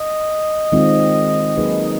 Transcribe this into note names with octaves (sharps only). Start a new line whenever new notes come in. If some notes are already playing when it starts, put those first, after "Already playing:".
Already playing: D#5
D#3 G#3 C4 F4
F#3 A#3 D#4 G#4 B4